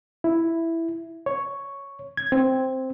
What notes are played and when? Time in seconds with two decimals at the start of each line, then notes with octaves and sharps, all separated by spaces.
0.24 E4
1.26 C#5
2.17 G#6
2.32 C4